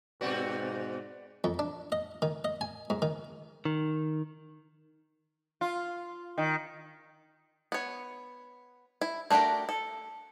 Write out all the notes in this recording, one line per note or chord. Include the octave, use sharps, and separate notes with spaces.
G#2 B2 C4 F#4 B4 D5 F#5
F2
D4
D#5
D#3
D#5
G#5
G#2
D#3
D#3
F4
D#3
B3 C#5
E4
A3 D4 F#4 G4 A#4
A4